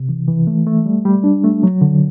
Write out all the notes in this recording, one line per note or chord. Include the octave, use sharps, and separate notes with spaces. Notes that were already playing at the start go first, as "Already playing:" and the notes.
Already playing: C3
E3
E3
A3
A3
G3
G3
D4
A3
F#3
D3